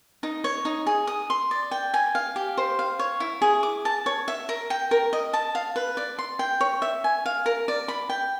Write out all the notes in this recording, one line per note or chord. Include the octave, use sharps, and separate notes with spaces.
D#4
C#5
D#4
G#4
D#6
C6
D5
G5
G#5
F5
G4
C5
F5
C#5
E4
G#4
D6
A5
C#5
E5
A#4
G5
A#4
D#5
A5
F5
B4
D5
C6
G5
C#5
E5
G#5
F5
A#4
D5
B5
G5